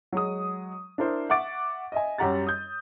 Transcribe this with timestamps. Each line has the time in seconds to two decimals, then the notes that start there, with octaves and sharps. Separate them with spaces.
0.12 F#3 G#3 D#6
0.98 D4 E4 A#4 C5
1.29 E5 F#5 C#6 D6 A6 D7
1.92 D#5 E5 G#5
2.18 F#2 G3 G4 F#5 A#5 A6
2.47 D#6 G6